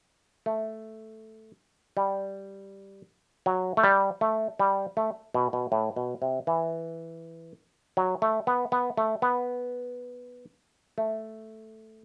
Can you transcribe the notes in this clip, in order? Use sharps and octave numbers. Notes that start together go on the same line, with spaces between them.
A3
G3
F#3
A3
G3
A3
G3
A3
B2
B2
A2
B2
C3
E3
F#3
A3
B3
B3
A3
B3
A3